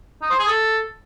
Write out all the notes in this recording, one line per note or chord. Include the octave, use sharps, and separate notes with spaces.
D#4
C5
G#4
A4